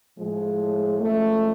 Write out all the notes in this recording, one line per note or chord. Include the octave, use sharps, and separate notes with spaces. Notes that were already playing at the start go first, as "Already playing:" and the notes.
A2 F3 G#3
F#2 F3 G#3 A3